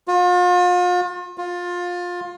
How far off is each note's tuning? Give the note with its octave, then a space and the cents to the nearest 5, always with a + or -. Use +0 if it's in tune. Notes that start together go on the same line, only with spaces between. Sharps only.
F4 +40
F4 +20